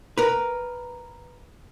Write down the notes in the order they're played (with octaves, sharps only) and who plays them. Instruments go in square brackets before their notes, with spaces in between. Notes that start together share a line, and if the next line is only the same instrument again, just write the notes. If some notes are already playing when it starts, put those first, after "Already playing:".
[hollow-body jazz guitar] A#4 B4